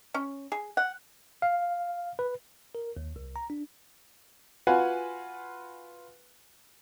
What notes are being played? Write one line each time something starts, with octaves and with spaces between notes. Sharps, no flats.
C#4
G#4
F#5
F5
B4
A#4
D#2
C2
A#5
D4
F4 F#4 B4 F#5 G#5